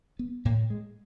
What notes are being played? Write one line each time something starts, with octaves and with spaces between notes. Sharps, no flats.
B3
A2 A#3
G#3